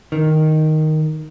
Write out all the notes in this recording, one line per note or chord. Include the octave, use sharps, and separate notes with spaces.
D#3